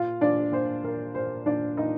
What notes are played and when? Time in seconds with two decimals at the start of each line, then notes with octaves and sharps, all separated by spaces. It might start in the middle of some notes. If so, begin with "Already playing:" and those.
Already playing: A#2 F4 F5
0.21 A#2 D4 D5
0.52 A#2 C5
0.84 A#2 A#4
1.15 A#2 C5
1.46 A#2 D4 D5
1.77 A#2 D#4 D#5